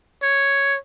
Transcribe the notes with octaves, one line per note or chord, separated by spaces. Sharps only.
C#5